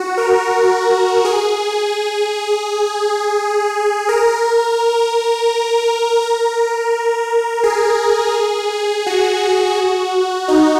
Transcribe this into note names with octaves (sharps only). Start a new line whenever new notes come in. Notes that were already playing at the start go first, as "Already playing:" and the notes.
Already playing: F#4
A#4
G#4
A#4
A#4
G#4
F#4
D#4